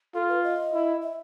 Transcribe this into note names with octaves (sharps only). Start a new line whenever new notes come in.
F4 A4
B4
D#5
E4
E5